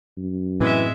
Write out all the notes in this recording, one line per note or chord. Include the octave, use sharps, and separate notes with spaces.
F#2
A2 E3 G#3 C4 E5